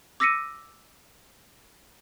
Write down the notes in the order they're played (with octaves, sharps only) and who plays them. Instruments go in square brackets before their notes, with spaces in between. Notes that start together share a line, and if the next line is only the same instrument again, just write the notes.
[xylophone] D6 E6 A#6 B6 C#7 D#7